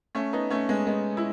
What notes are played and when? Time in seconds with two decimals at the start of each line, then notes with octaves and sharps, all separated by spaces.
0.15 A3 C#4
0.33 B3 D#4
0.50 A3 C#4
0.69 G#3 B3
0.87 G#3 B3
1.17 E4